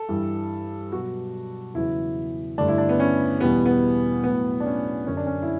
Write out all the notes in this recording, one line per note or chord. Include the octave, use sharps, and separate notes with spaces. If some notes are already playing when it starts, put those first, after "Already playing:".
Already playing: A4
G2 E3 G3
B2 F#3 B3 F#4
E2 C#3 F#3 B3 E4
G2 D3 A3 D4
E4
D4
B3
C#4
E2 B2 G3 B3
B3
A2 F#3 B3
D4
C#4
F#2 D3 F#3 C#4
D4
C#4
E4